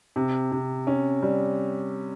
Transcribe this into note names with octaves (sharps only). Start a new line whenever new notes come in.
C3
C3
C#4
G3